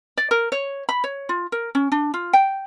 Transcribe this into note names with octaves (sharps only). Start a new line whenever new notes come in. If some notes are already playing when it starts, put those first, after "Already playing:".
D5
A#4
C#5
B5
C#5
F4
A#4
C#4
D4
F4
G5